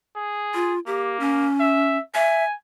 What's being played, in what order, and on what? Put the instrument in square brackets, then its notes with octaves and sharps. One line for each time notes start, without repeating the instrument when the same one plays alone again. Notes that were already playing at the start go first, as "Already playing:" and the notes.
[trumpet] G#4
[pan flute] F4
[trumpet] A#3 [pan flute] G4
[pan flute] C#4
[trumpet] E5
[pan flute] E5 [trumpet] G#5